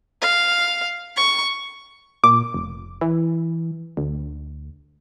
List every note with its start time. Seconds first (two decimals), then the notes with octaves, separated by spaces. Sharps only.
0.21 F5
1.16 C#6
2.24 A#2 D6
2.54 F1
3.01 E3
3.97 D2